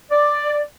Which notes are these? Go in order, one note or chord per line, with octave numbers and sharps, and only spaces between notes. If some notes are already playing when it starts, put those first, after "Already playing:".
D5